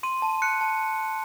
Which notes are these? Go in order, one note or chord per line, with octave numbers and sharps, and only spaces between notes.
C6 D#7
A5
F#6 C#7
A5